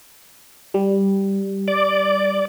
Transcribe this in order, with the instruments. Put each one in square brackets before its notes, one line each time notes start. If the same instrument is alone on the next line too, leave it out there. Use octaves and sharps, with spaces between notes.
[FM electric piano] G3
[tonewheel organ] D5